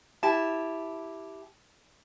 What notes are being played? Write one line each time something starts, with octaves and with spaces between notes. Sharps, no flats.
E4 G4 A5